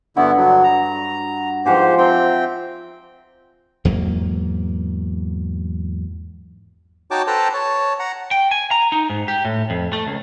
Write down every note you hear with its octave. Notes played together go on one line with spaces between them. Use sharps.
G2 D3 B3 E4 F#4 F#5
D3 F#3
A#5
G#2 F3 G4 C5 F#5 G#5
C4 E5 G5 A#5 C6
E2 G#2 F#3 A#3
D#4 F#4 C#5 G5 A5 D6
A4 B4 C5 G5 A5 A#5
C#5 A5
F#5 A#5
G5
G#5
A#5
D#4
G#2
G4
A2
F2
A3
C#2